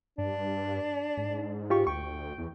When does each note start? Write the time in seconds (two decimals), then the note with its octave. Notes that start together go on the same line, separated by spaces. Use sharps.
0.18 G2 D4
1.17 G#2
1.70 F4 G4 C#6
1.87 D2 G5 C#6
2.38 E2